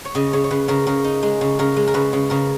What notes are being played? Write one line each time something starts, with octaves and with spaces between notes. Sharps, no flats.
C#5
C#3 D#5
C#3 C#5
C#5
C#3 B4
C#3 A#4
C#3 A#4
D#4
G#3
C#3
C#3 A#4
G#3
A#4
C#3 B4
C#3
C#3 A#4